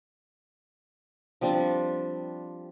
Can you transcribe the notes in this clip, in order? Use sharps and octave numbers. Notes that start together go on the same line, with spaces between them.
F3 G3 C4 D4